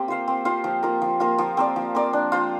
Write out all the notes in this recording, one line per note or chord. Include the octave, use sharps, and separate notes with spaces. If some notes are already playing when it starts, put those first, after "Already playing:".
Already playing: A#3 C4 G4
F4 C5 F5
C4
F4 C5 F5
F3
A#3 F4 A#4
F3
A#3 F4 A#4
F3
C4 A#4 D5
F3
C4 A#4 D5
D4
F4 C5